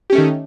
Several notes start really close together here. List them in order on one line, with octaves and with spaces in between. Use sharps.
G4 C#4 A3 D#3